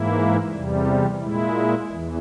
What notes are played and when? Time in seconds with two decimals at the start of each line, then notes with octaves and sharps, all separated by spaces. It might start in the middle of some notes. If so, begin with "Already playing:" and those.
Already playing: G#2 E3 A#3 E4
0.51 E2 C3 G3
1.20 A#2 G#3 E4
1.88 E2 E3